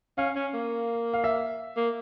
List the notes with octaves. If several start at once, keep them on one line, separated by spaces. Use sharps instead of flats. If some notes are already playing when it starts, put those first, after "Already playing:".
C#4 F5
C#4
A#3
F5
E5
A#3